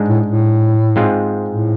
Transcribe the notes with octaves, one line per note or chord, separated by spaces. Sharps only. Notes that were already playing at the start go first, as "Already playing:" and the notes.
Already playing: G#2 G#3 D4
A2
A2
G#2 G#3 C4 F4
A2